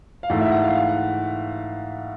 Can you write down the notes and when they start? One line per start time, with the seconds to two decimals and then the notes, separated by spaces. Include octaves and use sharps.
0.23 F5
0.30 G#2 E3 A3 F#5
0.41 E5
0.52 F#5
0.63 F5
0.74 F5
0.89 F#5